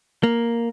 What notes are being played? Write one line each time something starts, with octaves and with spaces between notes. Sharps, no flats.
A#3